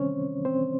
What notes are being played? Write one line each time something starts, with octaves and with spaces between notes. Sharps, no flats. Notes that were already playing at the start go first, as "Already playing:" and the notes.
Already playing: C3 D#3 G3 C4 C#4 C5 C#5
C4 C5